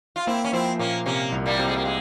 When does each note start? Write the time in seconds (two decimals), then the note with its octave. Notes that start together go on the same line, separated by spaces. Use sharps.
0.16 F4
0.27 A#3 C4 E4
0.44 C#4
0.53 F3 C4 E4
0.79 A#2 A#3 C#4
1.06 C3 A#3 C#4
1.32 C2
1.46 G3 A#3
1.59 C3
1.68 G#3
1.76 A#3
1.85 G#3